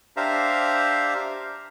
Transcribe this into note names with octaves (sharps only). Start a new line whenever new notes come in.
D4 G4 C5 E5 F5 A#5